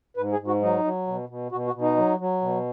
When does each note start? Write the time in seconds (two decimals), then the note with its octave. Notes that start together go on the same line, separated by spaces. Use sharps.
0.17 G#2 B4
0.32 G#4
0.39 G#2
0.47 F#4
0.62 F#3 D#4
0.84 F#3
1.07 B2
1.29 B2
1.52 B2 F#4
1.67 F#4
1.74 B2
1.81 D#4
1.97 F#3
2.19 F#3
2.41 B2